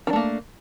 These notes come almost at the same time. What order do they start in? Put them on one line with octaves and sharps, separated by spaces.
D#3 D4 A3 A#3